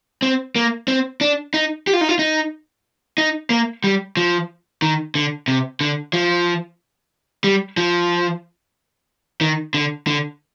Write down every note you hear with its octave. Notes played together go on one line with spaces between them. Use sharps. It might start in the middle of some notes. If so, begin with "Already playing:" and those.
C4
A#3
C4
D4
D#4
G4
F4
D#4
F4
D#4
D#4
A#3
G3
F3
D#3
D3
C3
D3
F3
G3
F3
D#3
D3
D3